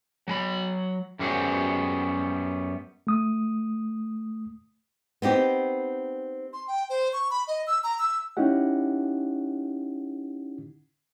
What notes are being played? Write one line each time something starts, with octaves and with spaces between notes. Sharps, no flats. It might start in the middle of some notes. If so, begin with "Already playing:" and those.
F#3 G#5 B5
F#2 G3 B3 F#4 G#4 C5
A3 D#6
B3 C4 D#4 G4
C6
G5
C5
C#6
B5
D#5
E6
A#5
E6
C#4 D#4 E4 G4 F#5